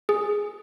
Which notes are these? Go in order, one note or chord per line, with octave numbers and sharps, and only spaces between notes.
G#4